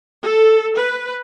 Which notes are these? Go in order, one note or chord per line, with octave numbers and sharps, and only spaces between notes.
A4
B4